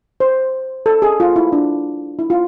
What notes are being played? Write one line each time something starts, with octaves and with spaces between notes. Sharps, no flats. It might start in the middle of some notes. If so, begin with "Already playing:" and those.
C5
A4
G#4
F4
E4
D4
E4
F4